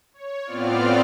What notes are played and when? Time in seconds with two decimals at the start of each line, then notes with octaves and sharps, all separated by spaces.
0.14 C#5
0.44 A2 B3 C4 F4 D5 F6